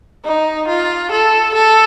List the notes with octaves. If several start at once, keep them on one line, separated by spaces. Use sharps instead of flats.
D#4
F4
A4
A4